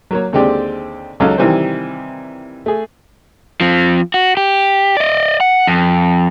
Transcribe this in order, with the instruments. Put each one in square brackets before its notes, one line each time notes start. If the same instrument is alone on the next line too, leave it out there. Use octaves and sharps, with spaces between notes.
[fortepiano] F#3 A#3 C#5
D#2 D3 G#3 C4 G4 D5
C#2 F#3 C#4 D#4 A4 F5
C3 D#3 E3 G3 C4 C5
A3 G#4
[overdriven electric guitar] F3 C4
F#4
G4
D5 D#5
F#5
F2